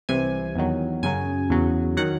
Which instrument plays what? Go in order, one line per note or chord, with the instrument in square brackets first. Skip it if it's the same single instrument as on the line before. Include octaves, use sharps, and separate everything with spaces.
[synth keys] C2 C3 E3 G#5
E2 D#3 F#3
F#2 C#3 F#3 G#5
E2 C#3 F#3
D#3 F#3 F#5